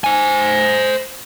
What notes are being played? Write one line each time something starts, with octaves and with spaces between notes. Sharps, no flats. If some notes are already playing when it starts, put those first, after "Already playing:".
C5 G#5